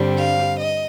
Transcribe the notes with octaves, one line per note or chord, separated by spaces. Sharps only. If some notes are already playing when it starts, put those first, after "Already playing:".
Already playing: G2 D3 G3 C4
F5
D#5